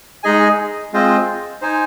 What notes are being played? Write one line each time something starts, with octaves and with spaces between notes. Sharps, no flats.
G#3 D#4 G#4 D#5 G#5
G#3 C4 F4 C5 D#5
D#4 C5 G#5